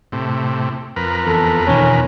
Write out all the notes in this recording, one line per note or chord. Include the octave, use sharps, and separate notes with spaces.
A2 C3
F2 A#4 B4
E2 A4
E2 B2 D#3 C#4